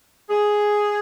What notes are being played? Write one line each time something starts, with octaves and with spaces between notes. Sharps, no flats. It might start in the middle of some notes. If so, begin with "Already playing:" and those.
G#4